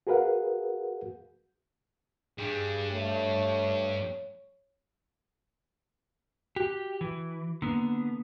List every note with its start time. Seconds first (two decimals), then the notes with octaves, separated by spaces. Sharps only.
0.07 F#4 G#4 A#4 B4 F5 F#5
2.38 G2 G3 G#4
2.92 A3 C#5
6.56 F#4 G4
7.01 E3
7.62 D3 A#3 B3